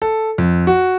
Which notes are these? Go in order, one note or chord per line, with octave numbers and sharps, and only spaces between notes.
A4
F2
F#4